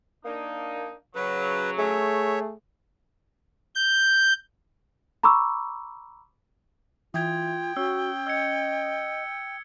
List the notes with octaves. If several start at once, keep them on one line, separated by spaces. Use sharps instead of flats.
A#3 D4 D#4
C#3 F#3 B4
A3 G#4 C#5 E5
G6
A#5 B5 C#6 D6 E6
E3 F4 G5 D#6 G#6
C#4 F#4 E6
D#5 E6 G#6 C#7